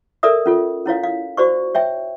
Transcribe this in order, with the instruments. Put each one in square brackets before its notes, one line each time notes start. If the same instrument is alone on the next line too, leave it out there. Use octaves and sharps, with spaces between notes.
[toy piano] A4 A#4 D5 E5 D#6
C#4 F4 A4
C#4 E4 C#5 F5
F5
F#4 C5 D5 C#6
C#5 E5 G5